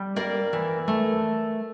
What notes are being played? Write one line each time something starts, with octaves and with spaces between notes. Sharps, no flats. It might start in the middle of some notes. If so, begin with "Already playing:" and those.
Already playing: G3
A#3 A#4 D5
E3
A3